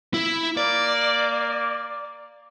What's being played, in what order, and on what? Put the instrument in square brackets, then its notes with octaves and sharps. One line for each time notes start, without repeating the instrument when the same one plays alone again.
[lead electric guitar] E4
[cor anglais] A#3 [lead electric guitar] D5